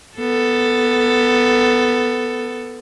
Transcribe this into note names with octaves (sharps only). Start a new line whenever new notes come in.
B3 A4